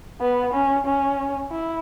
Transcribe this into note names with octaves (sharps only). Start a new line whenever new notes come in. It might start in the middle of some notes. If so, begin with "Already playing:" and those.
B3
C#4
C#4
E4